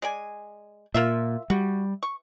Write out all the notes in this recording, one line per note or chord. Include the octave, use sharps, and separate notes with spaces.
G#3 D5 G#5
A#2 A#3 F4 E5
G3 F#4
C#6